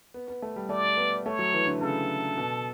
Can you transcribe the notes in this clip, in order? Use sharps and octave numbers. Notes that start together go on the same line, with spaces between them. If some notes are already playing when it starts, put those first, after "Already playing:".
B3
B3
A3
G3
A3 D5
B3
A3 C#5
F#3
E3
D3
C#3 A4
B2